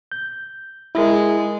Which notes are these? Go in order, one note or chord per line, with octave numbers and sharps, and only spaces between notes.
G6
G#3 E4 A#4